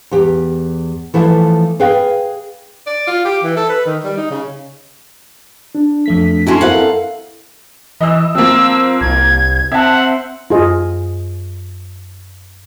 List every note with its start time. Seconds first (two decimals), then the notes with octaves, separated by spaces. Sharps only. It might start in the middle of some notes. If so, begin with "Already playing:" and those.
0.11 E2 G4
1.14 E3 F3 A3 E4
1.80 G#4 B4 F5 G5
2.87 D5
3.07 F4
3.25 G4
3.44 E3
3.56 A4
3.69 B4
3.86 D#3
4.04 G3
4.17 D#4
4.31 C#3
5.75 D4
6.06 F2 A3 B6
6.47 C#4 E4 F#4 A4 C6
6.61 C4 E4 A#4 F5 F#5
6.75 A4
8.01 E3 D#5 E6
8.35 F3 A#3 C4 E6
9.01 C2 G#6
9.72 C4 E5 F#5 A5
10.50 F#2 F4 G#4 D#5